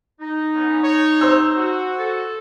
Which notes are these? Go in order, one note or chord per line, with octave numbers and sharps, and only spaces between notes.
D#4
B3 C#4
C#5
C5 E6
F#4
A4